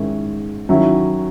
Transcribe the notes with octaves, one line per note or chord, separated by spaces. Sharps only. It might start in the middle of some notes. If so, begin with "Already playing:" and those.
Already playing: G#2 D#3 G#3 C#4 E4
D#3 F#3 C#4 E4